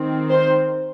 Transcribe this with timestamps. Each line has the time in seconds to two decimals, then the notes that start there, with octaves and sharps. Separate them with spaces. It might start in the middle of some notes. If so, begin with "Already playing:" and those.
Already playing: D#3 C4
0.30 C5